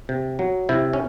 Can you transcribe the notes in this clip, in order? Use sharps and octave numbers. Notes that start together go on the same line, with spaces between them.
C3
F#3
C3 E4
C#4